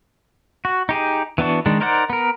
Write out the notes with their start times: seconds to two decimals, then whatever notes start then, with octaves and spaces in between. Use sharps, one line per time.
0.65 F#4
0.89 D#4 G4 G#4
1.38 E3 B3 D4 F#4
1.66 D#3 G#3 D4
1.80 D#4 A#4 C5 D5 F#5
2.10 B3 A#4